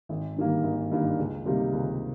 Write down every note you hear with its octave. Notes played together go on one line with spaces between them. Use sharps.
G#1
G2 D#3 G3 A#3
G#1
G2 D#3 G3 A#3
C#2
C3 G3 A#3 D#4
C#2